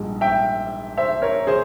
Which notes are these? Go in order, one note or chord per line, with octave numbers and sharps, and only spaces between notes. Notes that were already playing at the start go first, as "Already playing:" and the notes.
Already playing: A#1 G#2 G3
E5 G5
C5 E5
A#4 C#5
G#4 C5